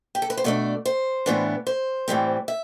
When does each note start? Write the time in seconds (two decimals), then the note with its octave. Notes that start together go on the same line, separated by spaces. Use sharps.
0.15 G4
0.22 A4
0.30 B4
0.37 C5
0.44 B2 A3 D4 D5
0.85 C5
1.26 A2 E3 B3 D4
1.67 C5
2.08 A2 E3 G3 C4
2.48 E5